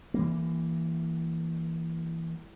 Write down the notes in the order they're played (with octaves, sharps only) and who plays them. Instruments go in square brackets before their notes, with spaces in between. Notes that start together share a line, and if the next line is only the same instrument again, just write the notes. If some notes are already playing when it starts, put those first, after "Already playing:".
[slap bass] E3 G3 A#3